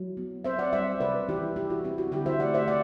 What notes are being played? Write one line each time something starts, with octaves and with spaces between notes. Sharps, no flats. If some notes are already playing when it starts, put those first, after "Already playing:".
Already playing: F#3 E4
B3
C4 C5 E5
D5 F#5
G3 C5 E5
C3 B4 D5
E3 E4 G4
E4 G4
F#4
C4 E4
F#4
D3 E4 G4
C5 E5
A3 D5 F#5
C5 E5
D5 F#5